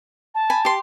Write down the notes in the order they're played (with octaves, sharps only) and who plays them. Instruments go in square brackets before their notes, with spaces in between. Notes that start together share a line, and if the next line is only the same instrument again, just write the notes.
[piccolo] A5
[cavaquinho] G#5 B5
G4 C6